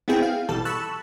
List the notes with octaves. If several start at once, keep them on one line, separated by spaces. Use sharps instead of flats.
B3 C4 E4 G#4 G5
F5
G#1 B2 E3 G3 A4 A5
A5 B5 C#6 E6 F#6